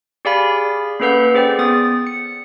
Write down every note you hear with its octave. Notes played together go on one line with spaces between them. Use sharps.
G4 G#4 D5 F5 G#5 B5
A#3 C#4 A4 B4 F#5 G6
C#4 G#4 C5 D5 G5
B3 D#6 A6
C#7